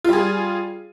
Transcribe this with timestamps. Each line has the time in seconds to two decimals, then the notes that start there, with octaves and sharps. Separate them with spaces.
0.04 F4
0.09 G3
0.13 G#4